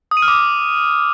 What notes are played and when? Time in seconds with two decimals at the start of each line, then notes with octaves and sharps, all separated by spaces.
0.11 D#6
0.17 D#7
0.22 F6
0.28 D6